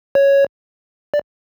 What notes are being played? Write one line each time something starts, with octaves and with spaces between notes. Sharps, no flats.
C#5
D5